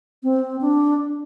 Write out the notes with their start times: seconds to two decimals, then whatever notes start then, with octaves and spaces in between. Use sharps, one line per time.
0.23 C4
0.61 D4